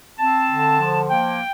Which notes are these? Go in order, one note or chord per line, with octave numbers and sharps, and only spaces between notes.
C4 A5
D3
F3
A#3 G5